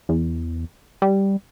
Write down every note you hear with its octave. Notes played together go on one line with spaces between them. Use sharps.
E2
G3